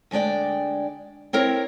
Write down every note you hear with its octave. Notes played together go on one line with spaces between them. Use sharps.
D2 G#3 D4 D5 G5
C4 E4 A#4 C#5